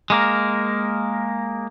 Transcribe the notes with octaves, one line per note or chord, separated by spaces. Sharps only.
G#3 A#3 A#4